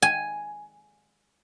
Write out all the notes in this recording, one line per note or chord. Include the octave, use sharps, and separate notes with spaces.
G#5